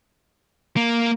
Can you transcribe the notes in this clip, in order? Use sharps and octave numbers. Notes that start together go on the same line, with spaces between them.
A#3